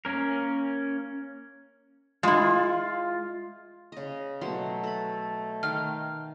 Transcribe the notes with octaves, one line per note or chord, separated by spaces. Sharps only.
A#3 C#4 A#4
G#3 E4 F4
C#3 D#5
B2 F#3 A3 C6
A4 B5
D#3 F5 G5 F6